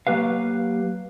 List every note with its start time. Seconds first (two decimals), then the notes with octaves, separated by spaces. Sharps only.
0.07 F#3 A#3 G4 B4 F5